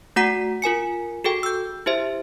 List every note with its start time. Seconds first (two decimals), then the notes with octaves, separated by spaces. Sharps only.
0.16 A3 F#4 F#5 A#5 B6
0.62 F4 A#4 G#5 C#7
1.24 F#4 G#4 A4 G5
1.43 E6 G6
1.86 E4 G4 C5 E5